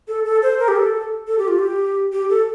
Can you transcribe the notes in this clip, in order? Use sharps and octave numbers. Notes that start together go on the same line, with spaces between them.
A4
A4
C5
A#4
G4
A4
A4
G4
F4
G4
G4
A4